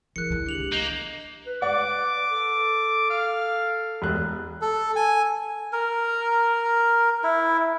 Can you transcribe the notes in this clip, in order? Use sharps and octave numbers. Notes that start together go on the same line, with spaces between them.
E3 E4 G#4 A#4 F#6 C#7
D#3 G3
D4 G4 C#7 F7 F#7
C#2
A#3 D#5 G6 F#7
B4
D5 F#5 D6
A4
F5
E1 F#6
A4
G#5
A#4
E4